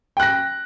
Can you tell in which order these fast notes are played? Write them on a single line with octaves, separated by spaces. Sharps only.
G5 F#6 A#6